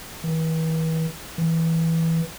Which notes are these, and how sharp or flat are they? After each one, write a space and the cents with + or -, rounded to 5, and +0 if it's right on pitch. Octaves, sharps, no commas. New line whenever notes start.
E3 -40
E3 -10